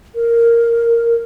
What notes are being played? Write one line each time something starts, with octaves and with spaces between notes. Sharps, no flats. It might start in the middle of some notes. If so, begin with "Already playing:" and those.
A#4